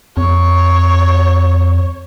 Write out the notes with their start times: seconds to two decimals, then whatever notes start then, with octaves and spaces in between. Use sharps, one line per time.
0.17 F2 C#5